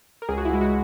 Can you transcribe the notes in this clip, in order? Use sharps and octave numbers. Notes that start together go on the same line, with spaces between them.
A#4
C#2 G#4
F#4
E4
G#3
F#4